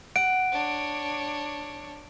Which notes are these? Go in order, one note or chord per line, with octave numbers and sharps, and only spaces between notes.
F#5 D7
D4 C#5